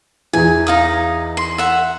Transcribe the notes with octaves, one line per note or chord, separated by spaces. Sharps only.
E2 E3 G#5
D#4 F5 D#6
C6
E5 F#5